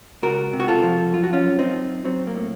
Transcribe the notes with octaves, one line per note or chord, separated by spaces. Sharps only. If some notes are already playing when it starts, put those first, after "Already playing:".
C#2 F#4 A#4
C3
F#4
F4 A4
F3
F#2 F4
F#4
C#4 F4
F#2
C4 D#4
F#2
F#3 C4
A#3
A2